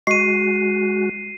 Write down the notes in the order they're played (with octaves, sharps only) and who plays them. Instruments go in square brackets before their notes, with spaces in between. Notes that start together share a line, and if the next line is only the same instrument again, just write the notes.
[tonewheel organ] G#3 F#4 [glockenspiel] C7 D#7